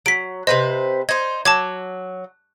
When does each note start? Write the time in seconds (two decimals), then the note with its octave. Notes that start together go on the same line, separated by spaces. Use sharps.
0.06 F#3 B6 D7
0.47 C3 B4 C5 D#5
1.09 D#4 C5 G#6
1.45 F#3 A5 D6 G#6